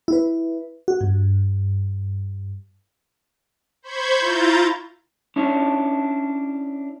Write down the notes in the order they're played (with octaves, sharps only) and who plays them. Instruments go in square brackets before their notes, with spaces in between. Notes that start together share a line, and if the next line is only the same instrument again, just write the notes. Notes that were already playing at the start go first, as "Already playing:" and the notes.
[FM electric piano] E4 B4
F#4
G2
[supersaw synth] C5 B5 C#6 G6 G#6
E4 F4 A#5 G6 A6
[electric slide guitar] C#4 D4 E4